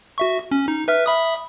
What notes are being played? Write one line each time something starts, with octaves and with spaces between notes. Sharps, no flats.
F#4 E5 C#6
C#4
D#4
B4 E5 F6
E5 B5 D#6